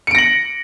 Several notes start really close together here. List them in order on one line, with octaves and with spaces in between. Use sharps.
C#7 D7 A#6 F#7